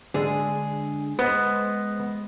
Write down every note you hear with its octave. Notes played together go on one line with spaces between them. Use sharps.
D3 G#3 D4 G#4
G#3 B3 C5